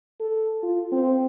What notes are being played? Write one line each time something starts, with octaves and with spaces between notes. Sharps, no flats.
A4
F4
C4